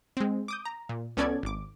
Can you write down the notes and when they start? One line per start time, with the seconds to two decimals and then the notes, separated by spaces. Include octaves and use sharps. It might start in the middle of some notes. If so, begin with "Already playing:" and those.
0.17 G#3 C4
0.48 D6 D#6 G6
0.65 A#5
0.89 A#2
1.17 C#2 B3 C#4 A4 D5 G#6
1.43 G#1 D6